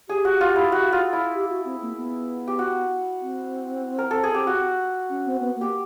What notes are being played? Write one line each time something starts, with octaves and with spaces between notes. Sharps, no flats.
G4 G#4
F#4
F4
E4
F#4
F4
E4
G4
F#4
C4
A#3
B3
G4
F#4
C4
A#4
A4
G#4
G4
F#4
C#4
C4
B3
A#3
G4